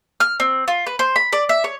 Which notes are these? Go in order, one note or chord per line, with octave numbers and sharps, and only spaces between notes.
F6
C4
F4
B4
C5
B5
D5
E5
C#5